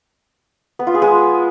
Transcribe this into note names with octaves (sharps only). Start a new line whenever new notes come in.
B3
F4
G#4
G#3